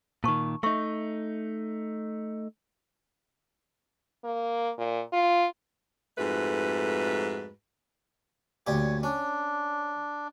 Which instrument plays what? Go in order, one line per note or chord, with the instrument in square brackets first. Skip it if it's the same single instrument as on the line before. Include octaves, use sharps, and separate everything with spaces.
[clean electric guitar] A#2 D#3 [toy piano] A5 C#6
[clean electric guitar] A3 D#4 [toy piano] E5 C#6
[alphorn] A#3
A#2
F4
[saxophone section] F2 G#2 A3 F#4 B4
[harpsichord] D2 A#2 G4 [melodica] C#5
[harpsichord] C#4 [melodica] D4